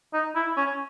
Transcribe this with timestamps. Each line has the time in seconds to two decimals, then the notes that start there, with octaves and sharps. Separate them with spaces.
0.14 D#4
0.35 E4
0.57 C#4